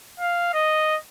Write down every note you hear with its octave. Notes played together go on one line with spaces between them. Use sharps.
F5
D#5